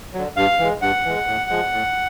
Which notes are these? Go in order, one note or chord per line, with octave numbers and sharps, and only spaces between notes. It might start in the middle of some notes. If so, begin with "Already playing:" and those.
D3 F#3
G2 F5
E3 G#3
G2 F#5
E3 G#3
A2
F3 G#3
A2